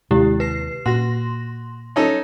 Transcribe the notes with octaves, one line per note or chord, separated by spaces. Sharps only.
D#2 C3 G#3 E4 G4
B4 C7
A#2 F#4 C6 A#6
C#4 D#4 A4